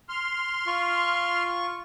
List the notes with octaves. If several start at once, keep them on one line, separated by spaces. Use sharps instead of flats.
C6 F6
F4 C#6